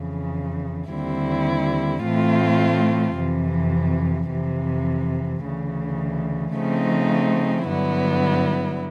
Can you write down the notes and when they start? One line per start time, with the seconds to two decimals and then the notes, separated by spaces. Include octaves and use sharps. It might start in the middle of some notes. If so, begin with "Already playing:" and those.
Already playing: F2 C#3 E3
0.90 D#2 D3 G3 C4 E4
2.03 A2 E3 A3 C4 F4
3.16 F2 C3 E3
4.28 F2 C3 E3
5.42 D2 C#3 E3
6.54 C#3 F3 A3 C4 D#4
7.66 G2 D3 F#3 B3 E4